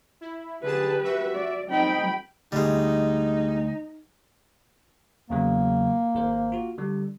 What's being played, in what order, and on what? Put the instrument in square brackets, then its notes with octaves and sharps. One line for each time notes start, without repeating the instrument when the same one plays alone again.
[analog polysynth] E4
[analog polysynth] D3 G#4 A5 [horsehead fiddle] G4 B4
[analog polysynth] F#4 E5
[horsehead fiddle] D5
[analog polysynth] C4 D#4 [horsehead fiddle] G5 B5
[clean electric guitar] D2 [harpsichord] G3 G#3 [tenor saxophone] D#4
[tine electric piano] E2 C#3 F#3 [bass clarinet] A#3
[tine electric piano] G#1 A#4 C5
F4 F#4
D3 G3